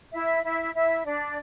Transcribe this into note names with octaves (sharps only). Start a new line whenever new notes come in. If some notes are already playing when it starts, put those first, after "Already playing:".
E4 E5
E4 E5
E4 E5
D4 D5